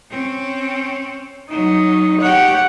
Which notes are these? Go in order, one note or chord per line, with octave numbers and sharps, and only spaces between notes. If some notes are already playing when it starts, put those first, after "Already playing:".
C4 C#4
F#3 D#4
G4 C#5 F#5